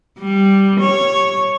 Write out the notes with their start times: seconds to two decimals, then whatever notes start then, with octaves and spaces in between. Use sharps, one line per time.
0.20 G3
0.80 C#5